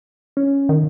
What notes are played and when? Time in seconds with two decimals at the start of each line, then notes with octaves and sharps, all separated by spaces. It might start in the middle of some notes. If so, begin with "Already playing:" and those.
0.37 C#4
0.69 D#3